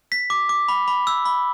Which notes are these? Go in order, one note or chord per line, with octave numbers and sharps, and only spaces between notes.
B6
D6
D6
B5
B5
E6
B5